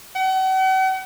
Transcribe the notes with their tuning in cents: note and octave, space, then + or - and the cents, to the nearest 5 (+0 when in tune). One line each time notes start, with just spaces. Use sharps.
F#5 +40